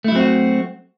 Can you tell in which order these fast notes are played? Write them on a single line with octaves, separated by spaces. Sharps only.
A3 E4 F#3 C4 F#4